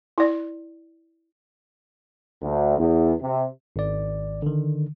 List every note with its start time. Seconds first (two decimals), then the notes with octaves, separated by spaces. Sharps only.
0.18 E4 D5
2.42 D2
2.79 E2
3.22 C3
3.76 G#1 D5
4.42 D3 D#3